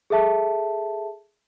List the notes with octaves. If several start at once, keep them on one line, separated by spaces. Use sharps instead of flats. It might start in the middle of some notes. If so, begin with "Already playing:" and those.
G#4 A4 E5 A5